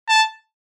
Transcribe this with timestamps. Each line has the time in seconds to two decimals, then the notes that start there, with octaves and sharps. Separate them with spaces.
0.09 A5